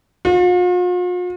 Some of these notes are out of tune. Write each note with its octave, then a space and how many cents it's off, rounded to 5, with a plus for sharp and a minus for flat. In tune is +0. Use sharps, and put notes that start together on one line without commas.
F4 +45